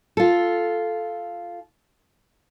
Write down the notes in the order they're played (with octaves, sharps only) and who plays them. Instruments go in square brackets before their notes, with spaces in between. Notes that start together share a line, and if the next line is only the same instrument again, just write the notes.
[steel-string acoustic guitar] F4 A4